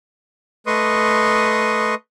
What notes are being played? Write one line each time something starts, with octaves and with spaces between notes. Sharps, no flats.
A3 B4 D#5 C6 C#6 D#6